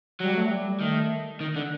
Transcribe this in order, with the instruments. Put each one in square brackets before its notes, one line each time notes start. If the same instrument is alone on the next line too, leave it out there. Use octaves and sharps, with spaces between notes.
[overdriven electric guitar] F#3 [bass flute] G3
[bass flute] A3
G3
[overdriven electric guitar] D#3 [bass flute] A3
[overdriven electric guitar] D#3
D3